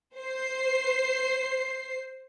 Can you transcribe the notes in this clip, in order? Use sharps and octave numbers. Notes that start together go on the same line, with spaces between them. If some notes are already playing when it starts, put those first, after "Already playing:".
C5 C7